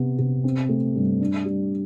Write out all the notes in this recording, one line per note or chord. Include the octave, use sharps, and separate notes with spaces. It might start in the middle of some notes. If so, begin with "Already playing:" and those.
Already playing: C3 B3
C3
C4
A3
G2
D4
G3